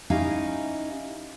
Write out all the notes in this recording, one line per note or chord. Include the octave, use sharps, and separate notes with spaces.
C#4 D#4 E4 G4 F5 G#5